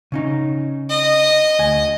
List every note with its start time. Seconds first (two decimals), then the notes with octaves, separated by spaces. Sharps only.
0.12 C#3 C#4 D#4
0.90 D#5
1.59 D2 G#5